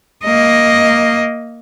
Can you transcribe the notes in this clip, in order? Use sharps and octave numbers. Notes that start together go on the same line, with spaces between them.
A#3 D#5